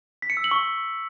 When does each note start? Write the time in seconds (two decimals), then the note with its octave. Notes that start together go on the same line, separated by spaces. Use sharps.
0.22 B6
0.30 C#7
0.37 E6
0.44 F#7
0.51 C#6